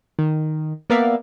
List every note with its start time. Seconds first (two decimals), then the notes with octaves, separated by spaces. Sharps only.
0.19 D#3
0.90 A#3 B3 A#4 D5 E5 F5